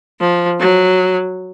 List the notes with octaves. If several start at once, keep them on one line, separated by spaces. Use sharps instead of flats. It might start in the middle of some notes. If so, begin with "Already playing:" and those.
F3
F#3